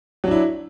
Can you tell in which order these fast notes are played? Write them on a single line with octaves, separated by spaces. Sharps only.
F#3 D4 E4